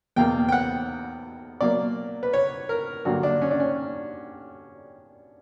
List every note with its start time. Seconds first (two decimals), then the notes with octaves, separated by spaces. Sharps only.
0.16 E2 B2 A#3 G5
0.49 G5
0.52 F#5
1.61 B2 F#3 A#3 D5
2.23 B4
2.33 C#5
2.69 A#4
3.05 G2 D3 F#3 A#3 F#4
3.23 D4
3.42 C#4
3.51 D4
3.60 C#4